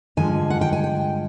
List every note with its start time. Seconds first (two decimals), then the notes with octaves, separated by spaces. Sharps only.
0.17 G2 D3 F3 G#3 G#5
0.50 F#5
0.61 G5
0.73 G#5
0.84 G5